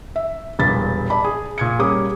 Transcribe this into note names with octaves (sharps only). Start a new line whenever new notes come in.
E5
E1 G2 A#2 A6 B6
D5 A5 B5
G#4
A#2 G#6 C#7
G3 A#3 C#4 G#4 D6 D#6